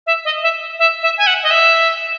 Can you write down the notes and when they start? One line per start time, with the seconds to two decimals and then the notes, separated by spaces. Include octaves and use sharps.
0.07 E5
0.25 D#5
0.43 E5
0.79 E5
1.03 E5
1.18 G#5
1.27 F#5
1.43 D#5
1.51 E5